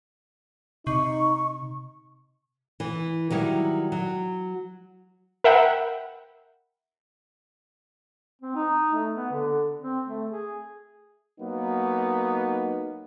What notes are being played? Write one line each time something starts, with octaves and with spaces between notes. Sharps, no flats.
C3 D#4 C#6
E3
D#3 F#3 G3 E4
F#3
A#4 E5 F#5 G5 B5
C4
D#4
A3
B3
D3
C4
A3
G#4
F#3 A#3 B3 D#4